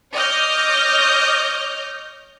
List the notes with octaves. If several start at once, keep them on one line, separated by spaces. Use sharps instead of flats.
C#5 D#5 D6 F6 G6 A#6